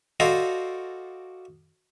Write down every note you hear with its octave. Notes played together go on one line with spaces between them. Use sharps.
F#4 A4 C5 D5 D#5 F5